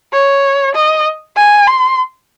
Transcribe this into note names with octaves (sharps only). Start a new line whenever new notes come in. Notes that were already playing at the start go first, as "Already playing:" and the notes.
C#5
D#5
G#5
C6